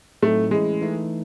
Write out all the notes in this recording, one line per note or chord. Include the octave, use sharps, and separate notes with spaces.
A2 F#3 A3 C4 D#4
E3 G#3 A3 C#4 E4
E3 A3 D#4